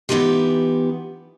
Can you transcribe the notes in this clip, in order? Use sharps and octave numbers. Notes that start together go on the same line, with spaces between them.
E3 G3 B3 D#4 F4 G4